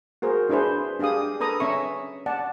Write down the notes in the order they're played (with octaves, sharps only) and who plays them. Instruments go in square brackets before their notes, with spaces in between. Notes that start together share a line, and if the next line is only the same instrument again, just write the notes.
[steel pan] F#4 G#4 A#4 C5
D4 E4 G#4 B4 C5
D4 G4 G#4 F5 D#6
A4 B4 A#5 D#6
C#4 E5 C#6
D5 F#5 A5